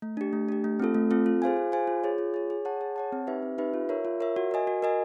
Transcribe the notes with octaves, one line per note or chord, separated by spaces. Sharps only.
A3
D4 G4
A3
D4 G4
A3
C4 F4 A4
A3
C4 F4 A4
F4
G#4 C5 F5 G#5
F4
G#4 C5 F5 G#5
F4
G#4 C#5
F4
G#4 C#5
G#4
C#5 F#5 A5
G#4
C#5 F#5 A5
C4
D#4 G4 B4 E5
C4
D#4 G4 B4 E5
F4
A#4 C#5 E5
F4
A#4 C#5 E5
F#4
A#4 D#5 G#5
F#4
A#4 D#5 G#5